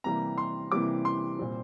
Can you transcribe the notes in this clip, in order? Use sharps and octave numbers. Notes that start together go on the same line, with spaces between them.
C3 E3 G3 A#3 A#5
C6
C3 E3 G3 A#3 D6
C6
A#2 G3 C4